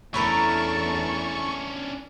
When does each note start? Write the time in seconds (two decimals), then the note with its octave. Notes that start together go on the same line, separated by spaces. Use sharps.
0.14 E2 A3 C#4 D4 E4 A#4 A5 C#6